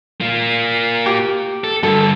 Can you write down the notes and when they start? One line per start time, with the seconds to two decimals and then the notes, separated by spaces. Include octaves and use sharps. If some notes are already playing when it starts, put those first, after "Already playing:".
0.21 A#3 F4
1.06 G4
1.64 A4
1.83 G2 D3 A4